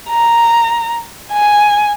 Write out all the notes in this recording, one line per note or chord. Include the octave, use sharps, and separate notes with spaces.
A#5
G#5